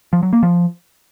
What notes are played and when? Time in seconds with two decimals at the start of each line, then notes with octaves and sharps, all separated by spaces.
0.13 F3
0.23 F#3
0.33 A#3
0.43 F3